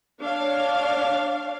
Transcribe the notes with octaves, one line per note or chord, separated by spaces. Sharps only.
D4 C#5 F5